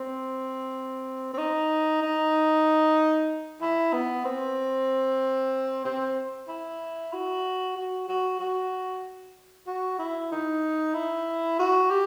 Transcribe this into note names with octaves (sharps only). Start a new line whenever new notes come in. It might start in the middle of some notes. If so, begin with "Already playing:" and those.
Already playing: C4
C4
D#4
D#4
E4
B3
C4
C4
E4
F#4
F#4
F#4
F#4
F#4
E4
D#4
E4
F#4
G4